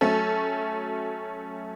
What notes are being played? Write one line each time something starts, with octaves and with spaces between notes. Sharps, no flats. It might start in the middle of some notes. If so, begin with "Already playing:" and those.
F#3 A3 C#4 A4